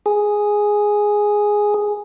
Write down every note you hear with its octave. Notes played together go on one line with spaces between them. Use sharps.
G#4